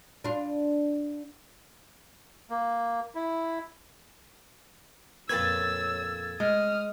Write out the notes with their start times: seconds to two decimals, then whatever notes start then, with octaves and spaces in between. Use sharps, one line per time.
0.24 D4 F4
2.50 A#3
3.15 E4
5.29 F2 A#2 B4 C#5 E6 G#6 A6
6.40 G#3 D#6 F6